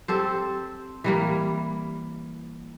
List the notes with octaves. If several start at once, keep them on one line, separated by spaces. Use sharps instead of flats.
C4 G4 A4 C5
E3 G3 A#3